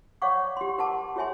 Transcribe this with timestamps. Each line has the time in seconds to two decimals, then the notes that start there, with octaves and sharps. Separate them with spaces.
0.22 C#5 D5 F5 F#5 C#6 D6
0.57 G4 C6
0.79 A#4 F#5 A5 D6
1.16 F#4 G#4 C#5 E5 G#5 C6